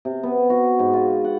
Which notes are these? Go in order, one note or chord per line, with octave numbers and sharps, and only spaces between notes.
C3
B3
F#4
G#2
F4
F#5